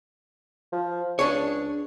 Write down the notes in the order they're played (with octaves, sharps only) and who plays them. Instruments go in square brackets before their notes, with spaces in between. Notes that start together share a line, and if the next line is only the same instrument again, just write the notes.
[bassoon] F3
[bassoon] C#2 [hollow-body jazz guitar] D4 G#4 C#5